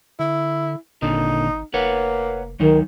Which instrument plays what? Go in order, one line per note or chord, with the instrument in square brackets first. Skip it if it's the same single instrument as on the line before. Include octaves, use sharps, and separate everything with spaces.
[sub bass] D3 [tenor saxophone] E4
[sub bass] G#1 [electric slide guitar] A#2 D3 [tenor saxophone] D#4
[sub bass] F1 [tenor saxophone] A#3 [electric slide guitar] B4 C#5 F#5
[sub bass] C#2 [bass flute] D#3 [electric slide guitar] F#3 D#4